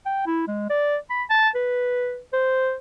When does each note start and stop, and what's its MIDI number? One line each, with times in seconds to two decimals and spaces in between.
0.06 0.22 79
0.26 0.44 64
0.48 0.70 56
0.70 0.97 74
1.10 1.23 83
1.30 1.49 81
1.55 2.19 71
2.33 2.76 72